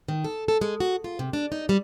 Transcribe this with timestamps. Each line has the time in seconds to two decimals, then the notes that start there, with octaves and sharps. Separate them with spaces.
0.08 D#3
0.24 A4
0.48 A4
0.61 G#3
0.80 F#4
1.04 F4
1.19 C3
1.33 D4
1.52 D#4
1.69 G3